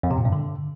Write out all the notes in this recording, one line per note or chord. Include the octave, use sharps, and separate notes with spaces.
F2
C3
A#2
G2
D3